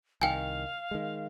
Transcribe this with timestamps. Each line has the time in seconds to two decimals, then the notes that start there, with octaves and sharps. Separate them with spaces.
0.22 C2 D#3 F5 G5 G#5
0.91 D#3 G#3